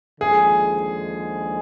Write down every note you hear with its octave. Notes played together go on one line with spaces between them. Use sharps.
D#2 D3 F3 G#3 G#4